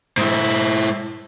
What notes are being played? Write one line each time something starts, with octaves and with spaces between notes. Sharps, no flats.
G#2 E4